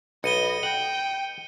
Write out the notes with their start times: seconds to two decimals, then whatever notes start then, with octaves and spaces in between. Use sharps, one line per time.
0.24 B1 D#5 B5 C#7 D#7 G7
0.63 F#5 G5